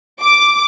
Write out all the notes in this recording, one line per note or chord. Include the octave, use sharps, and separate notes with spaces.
D6